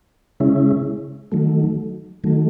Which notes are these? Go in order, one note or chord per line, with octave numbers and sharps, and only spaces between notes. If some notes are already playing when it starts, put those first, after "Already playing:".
C#3 G#3 C#4 E4
D#3 F#3 A3
D#3 F#3 A3